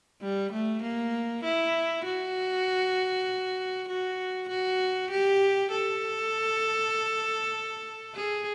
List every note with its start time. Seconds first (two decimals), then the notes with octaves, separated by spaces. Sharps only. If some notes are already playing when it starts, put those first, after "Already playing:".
0.22 G3
0.52 A3
0.82 A#3
1.44 E4
2.05 F#4
3.88 F#4
4.49 F#4
5.11 G4
5.71 A4
8.15 G#4